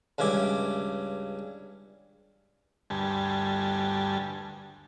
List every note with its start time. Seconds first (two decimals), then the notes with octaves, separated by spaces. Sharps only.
0.18 C#2 G2 C#3 E4 D6
2.90 D2 G2 G3 G#5 A5